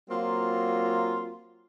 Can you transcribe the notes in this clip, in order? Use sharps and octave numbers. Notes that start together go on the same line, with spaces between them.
F#3 A#3 C4 F4